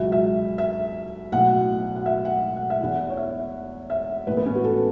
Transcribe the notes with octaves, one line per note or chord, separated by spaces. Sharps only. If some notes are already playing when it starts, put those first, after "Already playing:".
Already playing: C#2 B2 F#3 E5
E5
E5
B1 A2 F#3 F#5
F#5
E5
F#5
F#5
E5
E2 E3 F#5
C#5
E5
E5
A1 A2 E3 B4
B3
C#4
F#4
A4